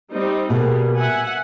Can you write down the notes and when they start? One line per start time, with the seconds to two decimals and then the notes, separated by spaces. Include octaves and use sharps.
0.12 G3 C4 D#4
0.50 B2 G3 A#3 G#4
0.95 E5 F#5 G#5